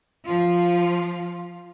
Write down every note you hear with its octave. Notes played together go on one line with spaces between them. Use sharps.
F3 F4